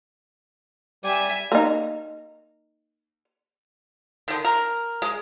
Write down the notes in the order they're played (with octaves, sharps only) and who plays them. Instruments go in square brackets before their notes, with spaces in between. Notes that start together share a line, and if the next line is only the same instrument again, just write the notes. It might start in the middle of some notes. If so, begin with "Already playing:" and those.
[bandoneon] G3 G4 D5 [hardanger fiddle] E5 G#5
[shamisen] A#3 D#4
[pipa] D3 D#3
A#4
G#3